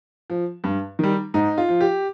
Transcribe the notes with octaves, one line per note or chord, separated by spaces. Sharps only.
F3
G2
D#3 G3
G#2 D#4
F4
F3
G4